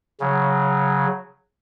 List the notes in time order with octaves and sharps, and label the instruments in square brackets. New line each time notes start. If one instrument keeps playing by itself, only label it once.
[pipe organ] C#3 F#3